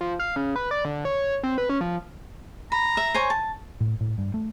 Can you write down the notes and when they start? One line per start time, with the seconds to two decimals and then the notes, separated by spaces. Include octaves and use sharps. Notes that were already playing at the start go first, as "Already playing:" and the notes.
0.01 F3
0.20 F5
0.36 C#3
0.56 B4
0.71 D5
0.85 D3
1.05 C#5
1.43 C4
1.58 B4
1.69 C#4
1.81 F3
2.72 A#5 B5
2.97 E5
3.14 C5 C#5 G#5
3.30 A5
3.81 A2
4.00 A2
4.18 G2
4.34 A3